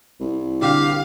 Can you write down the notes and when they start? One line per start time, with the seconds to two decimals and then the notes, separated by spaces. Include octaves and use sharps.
0.20 C2
0.62 D3 G4 F5